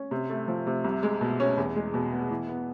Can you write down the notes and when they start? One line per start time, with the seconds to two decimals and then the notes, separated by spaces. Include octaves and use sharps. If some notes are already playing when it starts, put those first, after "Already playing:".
Already playing: C#4
0.11 C3
0.30 A3
0.48 F3
0.67 C3
0.84 C2
1.03 G#3
1.21 B2
1.40 C#4
1.57 E2
1.76 G#3
1.94 B2
2.12 B3
2.30 E3
2.48 B3